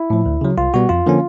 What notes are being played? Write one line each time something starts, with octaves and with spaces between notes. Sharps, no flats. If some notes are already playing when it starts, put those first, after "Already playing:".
Already playing: E4
A2 F3
D2
C#3 F#3
C2 F4
B2 G3 B3 F#4
F2 F4
D3 F3 A#3 C#4